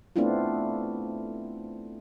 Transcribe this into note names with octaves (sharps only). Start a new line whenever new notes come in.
A3 B3 C4 D4 E4 F4